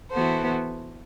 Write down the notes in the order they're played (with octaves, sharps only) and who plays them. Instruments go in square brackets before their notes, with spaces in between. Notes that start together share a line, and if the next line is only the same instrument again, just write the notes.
[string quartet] E3 B3 F#4 A4 C5